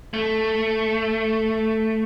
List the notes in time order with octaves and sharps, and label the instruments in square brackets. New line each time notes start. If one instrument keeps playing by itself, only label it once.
[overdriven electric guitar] A3